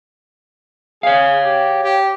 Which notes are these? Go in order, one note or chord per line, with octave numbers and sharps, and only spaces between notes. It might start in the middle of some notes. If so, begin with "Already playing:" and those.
G#4 C#5 F5
G4
G4